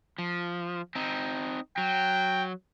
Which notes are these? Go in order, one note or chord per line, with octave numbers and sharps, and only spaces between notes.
F3
C4 D#4
F#3 G5